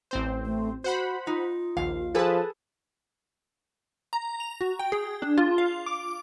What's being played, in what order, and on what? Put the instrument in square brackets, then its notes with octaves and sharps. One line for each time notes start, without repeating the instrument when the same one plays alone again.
[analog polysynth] A1 C4 C5
[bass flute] A3
[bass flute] F#4 [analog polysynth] C5 F#5 B5
[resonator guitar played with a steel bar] D#4 [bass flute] F4
[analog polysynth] A#1 D#2 [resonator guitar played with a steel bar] F5
[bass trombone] F3 [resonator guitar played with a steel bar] G#4 A4 [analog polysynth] B4 A5
[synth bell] A#5
F7
F#4
G5
G#4
D4
F4
F5
D6